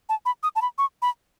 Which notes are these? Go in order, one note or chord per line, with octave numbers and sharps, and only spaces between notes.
A5
B5
D#6
A5
B5
C#6
B5